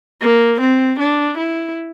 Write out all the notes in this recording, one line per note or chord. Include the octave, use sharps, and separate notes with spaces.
A#3
C4
D4
E4